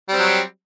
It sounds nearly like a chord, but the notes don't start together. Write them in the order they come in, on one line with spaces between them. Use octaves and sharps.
G3 C4 F#3